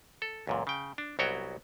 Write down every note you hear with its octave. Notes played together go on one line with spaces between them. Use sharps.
A4
C#2 F#2 A#2
C#3 G5
D4
C2 F#3 B3 F#4 C#5 G5